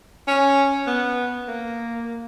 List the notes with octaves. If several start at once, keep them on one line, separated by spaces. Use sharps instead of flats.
C#4
B3
A#3